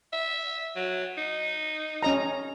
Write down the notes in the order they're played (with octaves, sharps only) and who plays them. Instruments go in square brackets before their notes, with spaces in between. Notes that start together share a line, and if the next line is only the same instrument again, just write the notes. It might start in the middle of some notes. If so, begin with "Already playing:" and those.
[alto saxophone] E5
F#3
D#4
[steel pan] C#4 D#5 A#5